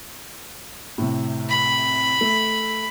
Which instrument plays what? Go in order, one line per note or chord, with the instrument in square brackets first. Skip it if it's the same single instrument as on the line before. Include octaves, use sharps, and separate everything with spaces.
[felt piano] A2 C3
[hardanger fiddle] B5
[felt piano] A3